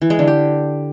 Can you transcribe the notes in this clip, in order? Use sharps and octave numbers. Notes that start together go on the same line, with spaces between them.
E3
G#3
D3
G4